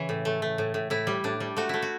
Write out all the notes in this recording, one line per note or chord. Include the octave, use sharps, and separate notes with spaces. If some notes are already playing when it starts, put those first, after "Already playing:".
Already playing: C#3 E3 C#5
A2
A3
A3
A2
A2
A2 E4
G3
A2 D4
G3
A3 F#4
A3 E4
F#4